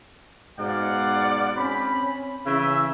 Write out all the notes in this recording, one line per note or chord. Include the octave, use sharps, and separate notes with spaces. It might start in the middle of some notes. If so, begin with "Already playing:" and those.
G#2 B2 D5 F5 F#5
C4 C#4 B5
C#3 E3 E5